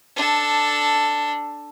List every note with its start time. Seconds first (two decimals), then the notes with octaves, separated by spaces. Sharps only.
0.16 D4 A4